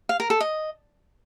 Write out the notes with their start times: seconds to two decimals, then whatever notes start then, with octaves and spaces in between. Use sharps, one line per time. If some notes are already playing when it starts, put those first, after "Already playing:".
0.09 F5
0.20 A#4
0.30 A4
0.40 D#5